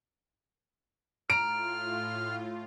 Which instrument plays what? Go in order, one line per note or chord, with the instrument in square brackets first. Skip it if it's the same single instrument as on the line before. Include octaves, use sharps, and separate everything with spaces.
[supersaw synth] A2 F4 [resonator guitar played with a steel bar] A#5 [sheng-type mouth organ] F6 [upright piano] D7